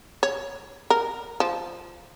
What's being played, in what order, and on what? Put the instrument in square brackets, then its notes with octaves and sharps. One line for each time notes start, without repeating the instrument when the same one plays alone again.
[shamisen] C#5
A#4
F3